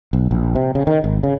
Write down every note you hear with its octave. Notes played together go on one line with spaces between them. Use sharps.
B1
A#1
C3
C#3
D#3
G#1
C#3